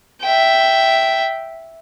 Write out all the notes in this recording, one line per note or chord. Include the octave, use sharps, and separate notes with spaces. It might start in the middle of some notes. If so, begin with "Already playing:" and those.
E5 G5